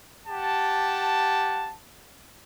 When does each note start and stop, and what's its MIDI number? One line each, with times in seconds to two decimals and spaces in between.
0.28 1.72 67
0.28 1.72 78
0.28 1.72 81